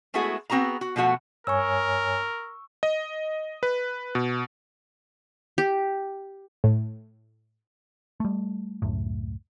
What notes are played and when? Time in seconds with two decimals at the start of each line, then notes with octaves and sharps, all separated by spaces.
0.14 G#3 A3 B3 E4 F#4 G#4
0.50 B3 C4 F#4 G#4 A#5
0.81 F#4
0.96 B2 F3 A3 F#4 F#5
1.47 G2 A#4 C#5 G#5 C#6 E6
2.83 D#5
3.63 B4
4.15 B2
5.58 G4
6.64 A2
8.20 G3 A3
8.82 C#2 F#2 A2